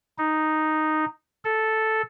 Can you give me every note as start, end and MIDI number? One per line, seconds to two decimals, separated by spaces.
0.18 1.05 63
1.45 2.02 69